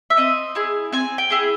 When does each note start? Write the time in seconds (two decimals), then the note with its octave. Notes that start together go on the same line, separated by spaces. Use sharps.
0.10 E5
0.17 C4 D#5
0.55 E4 G#4
0.92 C4 G#5
1.18 G5
1.30 E4 G#4